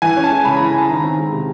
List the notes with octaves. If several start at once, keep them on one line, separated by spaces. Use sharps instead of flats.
E3 G#5
C#4
A5
G#3
C#3 B5
A#5
E3
A#5
C#4 A5
D#3 A#5
C4
G#3
C3